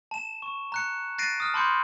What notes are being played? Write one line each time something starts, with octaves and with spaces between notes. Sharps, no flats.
A5 E7
C#6
A#5 F#6 C#7
F#6 A6 A#6 C7 D7 D#7
D#6 F6
A5 B5 C6 D6 G6 C#7